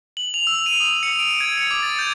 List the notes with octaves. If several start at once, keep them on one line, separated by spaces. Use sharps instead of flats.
F#7
F7
E6
D#7
D#6
C#7
D7
G#6
C#7
D6
A6
G6